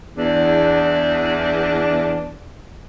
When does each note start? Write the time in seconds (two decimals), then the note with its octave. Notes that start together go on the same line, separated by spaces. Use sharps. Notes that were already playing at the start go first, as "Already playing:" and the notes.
0.17 E2 D4